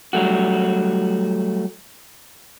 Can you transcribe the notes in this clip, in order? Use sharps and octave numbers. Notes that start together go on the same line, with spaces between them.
F#3 G3 A3 F#4